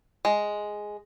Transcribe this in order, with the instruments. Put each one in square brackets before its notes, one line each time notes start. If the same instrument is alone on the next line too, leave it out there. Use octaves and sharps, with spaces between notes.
[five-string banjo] G#3